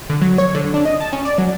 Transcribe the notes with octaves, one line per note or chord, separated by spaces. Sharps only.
D3
F#3
C#5
D3
D4
D#5
A5
C#4
D5
F#3